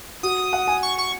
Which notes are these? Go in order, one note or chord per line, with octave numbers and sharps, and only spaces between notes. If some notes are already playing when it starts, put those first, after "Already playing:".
F#4 D#6
F#5
G#5
C#6
C#6